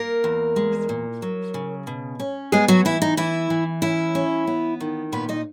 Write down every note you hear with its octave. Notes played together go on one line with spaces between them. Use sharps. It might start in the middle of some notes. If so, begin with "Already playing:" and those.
Already playing: A#3 A#4
E2
G#3
A#2
F#3
C#3
B2
C#4
G#3 B3 G#4
F#3 F#4
E3 E4
D#4
E3 E4
E3
C#4 E4
C#4
B3
D#3
A#2 B3 B4
D#4 D#5